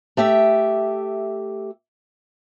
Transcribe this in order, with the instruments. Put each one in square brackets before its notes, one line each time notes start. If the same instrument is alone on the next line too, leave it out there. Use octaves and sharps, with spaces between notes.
[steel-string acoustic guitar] A3 G4 E5